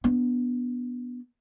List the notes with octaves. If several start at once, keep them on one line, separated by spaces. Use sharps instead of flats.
B3 D4